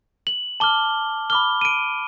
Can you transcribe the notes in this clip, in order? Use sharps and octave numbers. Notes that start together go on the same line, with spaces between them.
F#7
A5 D6 F6 G7
B5 D6 F6 G7
D#7
D7